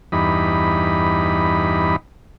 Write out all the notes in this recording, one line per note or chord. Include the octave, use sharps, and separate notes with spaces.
E2 G2 D#4 B5